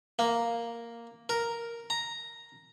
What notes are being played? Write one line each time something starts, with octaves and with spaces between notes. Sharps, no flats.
A#3
A#4
A#5